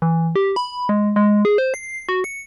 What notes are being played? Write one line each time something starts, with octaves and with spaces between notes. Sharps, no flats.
E3
G4
B5
G#3
G#3
G#4
C5
C7
F#4
C#7